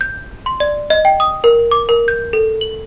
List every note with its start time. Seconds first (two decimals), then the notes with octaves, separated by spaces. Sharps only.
0.01 G6
0.46 C6
0.60 D5
0.90 D#5
1.05 G5
1.20 D#6
1.44 A#4
1.71 D6
1.89 A#4
2.08 G6
2.33 A4
2.61 F#7